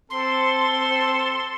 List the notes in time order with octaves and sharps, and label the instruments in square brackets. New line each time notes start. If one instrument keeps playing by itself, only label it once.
[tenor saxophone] C4 [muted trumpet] A4 [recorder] C6